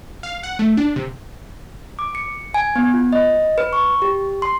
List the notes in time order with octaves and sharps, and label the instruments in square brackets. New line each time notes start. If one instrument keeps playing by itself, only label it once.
[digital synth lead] F5
F#5
A3
D4
C3
[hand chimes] D6
C#7
G#5
B3
F4
D#5
B4
C#6
G4
C6